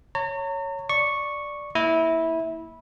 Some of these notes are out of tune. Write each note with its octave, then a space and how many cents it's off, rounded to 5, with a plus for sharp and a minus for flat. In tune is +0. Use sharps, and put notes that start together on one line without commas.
C#5 +0 A#5 -40
D5 +0 C#6 -5
A#3 +0 E4 -15